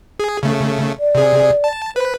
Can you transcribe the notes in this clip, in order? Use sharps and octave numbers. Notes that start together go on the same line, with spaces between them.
G#4
C#3 A3
D5
C3 G#4
A5
B4 C5